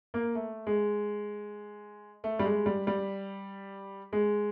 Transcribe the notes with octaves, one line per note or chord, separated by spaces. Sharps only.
A#3
A3
G#3
A3
G3
G#3
G3
G3
G#3